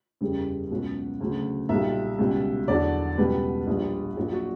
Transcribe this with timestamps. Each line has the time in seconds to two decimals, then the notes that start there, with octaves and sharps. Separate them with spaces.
0.21 F#1 E2 C#3 G3
0.71 C#2 B2 F#3
1.21 D2 C#3 F#3
1.69 B1 A#2 G3 E5
2.19 C#2 B2 G3
2.68 E2 D3 F#3 D5
3.18 C#2 B2 G3 B4
3.67 A#1 A#2 G3
4.17 A#1 A#2 F#3
4.33 F#4